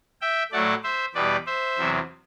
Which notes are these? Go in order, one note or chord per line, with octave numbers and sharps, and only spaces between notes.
E5 G5
A2 F#3 A3 D5 F#5
C5 E5
E2 B2 G3 B4 D5
C5 E5
E2 C3 F#3